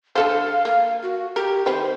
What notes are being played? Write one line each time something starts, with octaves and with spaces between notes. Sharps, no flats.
D3 A4 C5 F5
A#3 F5
F#4
G4 A#4
D#3 C4 B4 C5